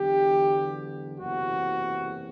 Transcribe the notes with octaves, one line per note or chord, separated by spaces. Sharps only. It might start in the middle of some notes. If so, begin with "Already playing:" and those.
Already playing: E2 D3 F#3 G4
F#1 E2 C3 F#4